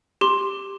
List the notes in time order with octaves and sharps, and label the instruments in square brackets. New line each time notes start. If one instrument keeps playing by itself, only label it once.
[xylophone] G4 C6